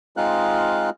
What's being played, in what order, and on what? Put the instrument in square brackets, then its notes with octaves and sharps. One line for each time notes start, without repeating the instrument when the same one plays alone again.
[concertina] G#3 C4 D#4 F4 F5 F#6